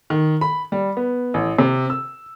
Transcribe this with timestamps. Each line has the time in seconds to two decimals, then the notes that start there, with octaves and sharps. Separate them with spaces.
0.10 D#3
0.41 B5
0.72 G3
0.97 B3
1.34 A1
1.59 C3
1.90 E6